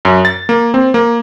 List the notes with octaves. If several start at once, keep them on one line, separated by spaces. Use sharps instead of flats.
F#2
A6
A#3
C4
A#3